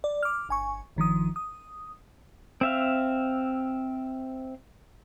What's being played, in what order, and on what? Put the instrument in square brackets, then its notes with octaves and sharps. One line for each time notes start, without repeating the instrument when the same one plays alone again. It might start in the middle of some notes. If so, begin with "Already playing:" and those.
[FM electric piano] D5
D6 F6
G1 G#5 C#6
G1 D#3 F3 D#6
D#6
[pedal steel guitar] C4 E5 F5